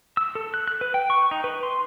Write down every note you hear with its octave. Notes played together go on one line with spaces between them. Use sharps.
E6
A4
F#6
F#6
B4
G5
C#6
D#4
B4
C6